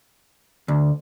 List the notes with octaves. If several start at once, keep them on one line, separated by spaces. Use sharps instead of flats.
D2